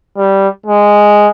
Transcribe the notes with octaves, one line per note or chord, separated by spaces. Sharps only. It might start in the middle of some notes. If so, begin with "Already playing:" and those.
G3
G#3